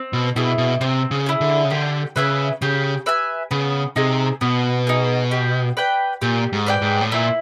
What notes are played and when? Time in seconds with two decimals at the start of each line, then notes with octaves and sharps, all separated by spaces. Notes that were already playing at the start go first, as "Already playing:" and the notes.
Already playing: C4
0.13 B2
0.36 B2 E4 G#4
0.58 B2
0.81 C3 C4
1.11 C#3
1.26 E4 G#4
1.41 D3
1.65 C#3
1.70 D3 G4
2.16 C#3 B4 E5 G#5
2.62 C#3 G4
3.06 B4 E5 G#5
3.51 C#3 B3
3.96 C3 D#4 G#4
4.41 B2 B3
4.87 D#4 G#4
5.31 G4
5.77 B4 D5 G5
6.22 A#2 G4
6.53 G#2
6.67 B4 D5 G5
6.82 G#2
7.01 A2
7.12 A#2 E4